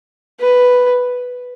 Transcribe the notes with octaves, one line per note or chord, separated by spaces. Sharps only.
B4